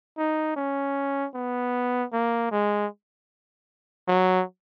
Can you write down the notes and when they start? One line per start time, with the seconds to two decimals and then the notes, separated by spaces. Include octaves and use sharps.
0.18 D#4
0.56 C#4
1.35 B3
2.13 A#3
2.52 G#3
4.08 F#3